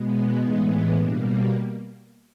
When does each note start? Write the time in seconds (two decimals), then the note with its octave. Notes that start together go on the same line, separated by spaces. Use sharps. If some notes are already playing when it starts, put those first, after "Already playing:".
Already playing: B2 G#3 B3
0.42 A2 E3 G#3 B3 D#4
0.96 B2 G3 A#3 D4